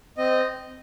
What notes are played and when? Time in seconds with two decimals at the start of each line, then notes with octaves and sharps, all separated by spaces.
0.18 C4 D#5